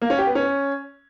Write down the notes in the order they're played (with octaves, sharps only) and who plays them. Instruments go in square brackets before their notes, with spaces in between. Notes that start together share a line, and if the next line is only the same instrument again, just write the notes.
[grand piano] A#3
C#4
G4
B3
C#4